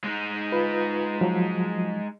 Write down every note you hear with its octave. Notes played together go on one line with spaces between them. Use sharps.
G#3 D#4
F4 B4
F3 F#3